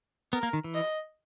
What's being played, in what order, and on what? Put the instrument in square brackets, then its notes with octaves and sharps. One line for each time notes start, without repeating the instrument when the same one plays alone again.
[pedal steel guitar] B3 [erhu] A#4
[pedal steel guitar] A#3
D#3
E3
[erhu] D#5